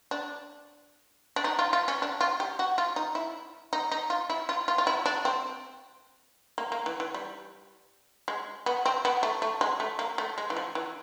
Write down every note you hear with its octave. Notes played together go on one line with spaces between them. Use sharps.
D4
D4
D#4
F4
F4
C#4
D4
F4
G4
F#4
F4
D#4
E4
D#4
D#4
F4
E4
F4
F4
F4
E4
D4
C4
A#3
A#3
E3
E3
G3
G#3
B3
C4
B3
A3
A3
G#3
A3
A#3
A3
G#3
E3
F3
E3